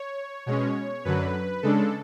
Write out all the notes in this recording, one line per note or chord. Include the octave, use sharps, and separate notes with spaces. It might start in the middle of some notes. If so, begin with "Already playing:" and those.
Already playing: C#5
B2 G#3 C#4 C#5
F#2 D3 F#3 B4
C#3 G#3 D4 A4